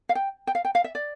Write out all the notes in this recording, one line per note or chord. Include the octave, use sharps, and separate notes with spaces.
F5
G5
G5
F5
G5
F5
E5
D5